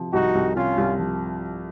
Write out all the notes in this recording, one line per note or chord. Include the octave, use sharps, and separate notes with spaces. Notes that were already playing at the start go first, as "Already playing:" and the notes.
Already playing: C3 F3
C2 D#4 F#4
C2
C3 C#4 F4
C2
F3